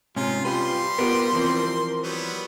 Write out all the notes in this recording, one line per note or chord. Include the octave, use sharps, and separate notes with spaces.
G#2 C3 C#4 F4
G3 F4 G4 B4 C6
B3 F4 G4 A#4
E3 F3 C4
F#3 G3 B3